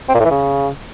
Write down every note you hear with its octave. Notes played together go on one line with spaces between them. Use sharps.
C4
A#2
A2
E3
C#3